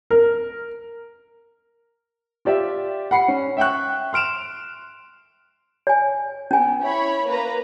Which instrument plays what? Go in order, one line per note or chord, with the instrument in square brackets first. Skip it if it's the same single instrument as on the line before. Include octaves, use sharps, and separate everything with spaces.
[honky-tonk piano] A#4
[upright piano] F4 G4 D5 E5
F#5 B5 C7 C#7
C#4
E5 G5 C#6 F#6
C6 F6 D7 E7 F7
[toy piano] C#5 G#5
[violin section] B3 [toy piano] C#4 G#5
[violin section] E4 C#5 B5
A#3 B4 A#5